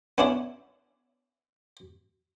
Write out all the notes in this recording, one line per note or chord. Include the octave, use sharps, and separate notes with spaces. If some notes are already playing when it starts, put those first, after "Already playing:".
B3 C#4 D4 E4